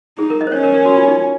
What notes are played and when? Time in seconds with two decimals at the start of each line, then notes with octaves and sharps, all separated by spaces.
0.19 D#4 G#4
0.30 A#4
0.41 D#5
0.47 C5
0.52 C#4 C#5
0.63 A#4
0.74 A#4
0.85 F#4
0.97 F4
1.08 D#4